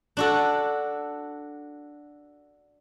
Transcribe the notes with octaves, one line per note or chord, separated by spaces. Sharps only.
D4 F#4 A4